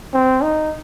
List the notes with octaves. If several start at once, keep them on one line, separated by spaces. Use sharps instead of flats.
C4
D#4